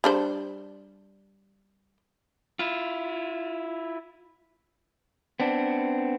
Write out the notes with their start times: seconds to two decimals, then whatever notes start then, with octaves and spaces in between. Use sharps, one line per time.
0.04 G3 D4 C5
2.59 E4 F4
5.40 B3 C4 D4